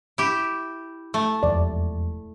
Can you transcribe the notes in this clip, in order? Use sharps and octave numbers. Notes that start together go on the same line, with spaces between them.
E4 G4
A3
E1 F2 D5